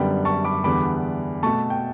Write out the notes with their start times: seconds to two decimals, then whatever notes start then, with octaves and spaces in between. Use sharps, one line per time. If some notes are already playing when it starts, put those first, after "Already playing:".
Already playing: F#2 D3 G3 B3 G5 B5
0.25 A5 C#6
0.45 B5 D6
0.64 E2 D3 G3 B3 B5 D6
1.43 B2 A3 A5 C#6
1.70 G5